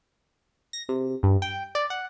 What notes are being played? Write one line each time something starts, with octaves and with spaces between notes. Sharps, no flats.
A#6
C3
G2
G5
D5
F#5